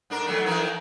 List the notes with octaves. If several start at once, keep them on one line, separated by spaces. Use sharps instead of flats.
G#2 D4 A#4
D#3 F#3 A3
D#3 E3 A#4